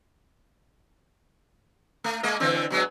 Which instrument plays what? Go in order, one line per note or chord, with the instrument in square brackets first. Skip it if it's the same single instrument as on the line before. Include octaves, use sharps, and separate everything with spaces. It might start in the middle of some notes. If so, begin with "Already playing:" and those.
[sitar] A3
G#3 A#3 D#5
D3 E3 C4
B2 F#3 G#3